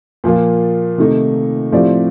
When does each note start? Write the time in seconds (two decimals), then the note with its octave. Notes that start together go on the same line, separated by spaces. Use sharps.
0.24 A#2 F3 A#3 F4
0.98 C3 D#3 A3 D#4
1.72 A2 F3 C4 G4 D5